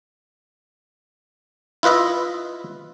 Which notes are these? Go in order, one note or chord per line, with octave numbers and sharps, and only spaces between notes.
E4 F4 B4 D#5 E5